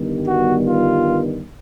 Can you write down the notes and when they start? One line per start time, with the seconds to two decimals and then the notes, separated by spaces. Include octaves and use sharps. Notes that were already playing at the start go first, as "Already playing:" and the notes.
Already playing: G1 G2 D#3 G3 B3
0.26 F#4
0.65 F4